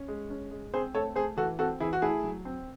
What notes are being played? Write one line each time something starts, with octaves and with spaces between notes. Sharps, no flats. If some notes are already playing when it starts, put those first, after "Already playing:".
Already playing: C#4
G#3
C#4
G#3
C4 G#4 C5
A3 A4 C#5
A3 G#4 C5
E3 F#4 A4
C4 F#4 A4
E3 E4 G#4
F#4
A3 E4 G#4
F#3
C4